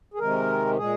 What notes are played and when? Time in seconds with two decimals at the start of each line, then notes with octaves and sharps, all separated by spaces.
0.14 G#4
0.19 C3 D#3 G#3 A#4
0.77 A#2 G#3 G#4